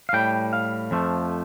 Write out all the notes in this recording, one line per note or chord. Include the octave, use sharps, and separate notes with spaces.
F5
A2 G3 G5
F5
F2 F3 A3